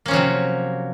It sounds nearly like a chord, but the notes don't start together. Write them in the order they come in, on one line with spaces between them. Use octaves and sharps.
A#3 C#4 F3 F#3 C3